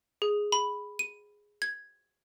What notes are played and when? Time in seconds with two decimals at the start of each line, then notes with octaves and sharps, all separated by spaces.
0.22 G#4
0.52 B5
0.99 D#7
1.62 G#6